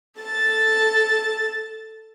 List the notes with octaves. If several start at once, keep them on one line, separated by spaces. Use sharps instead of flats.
A4 A5 A6